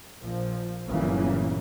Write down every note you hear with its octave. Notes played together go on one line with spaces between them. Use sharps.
A#1 A#2 F3
G1 A#2 C#3 E3 F#3 A#3